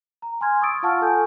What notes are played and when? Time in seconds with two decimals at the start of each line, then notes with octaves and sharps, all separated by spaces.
0.22 A#5
0.41 G#5 C6 F6 G#6
0.61 C#6 D#6 E6 A6 D7
0.83 F4 F5 F#5 A5 C#6 F6
1.01 A4 G#5 G6